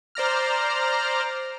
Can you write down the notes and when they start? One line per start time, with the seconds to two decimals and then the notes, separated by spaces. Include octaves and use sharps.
0.15 C5 D5 A#5 F6